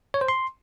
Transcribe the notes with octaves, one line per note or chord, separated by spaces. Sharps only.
C#5
C5
C6